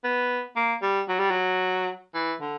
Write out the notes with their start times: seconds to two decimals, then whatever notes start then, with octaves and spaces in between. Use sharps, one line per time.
0.04 B3
0.56 A#3
0.83 G3
1.09 F#3
1.20 G3
1.30 F#3
2.15 E3
2.41 D3